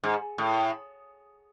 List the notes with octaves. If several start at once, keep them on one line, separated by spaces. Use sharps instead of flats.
G#2
A2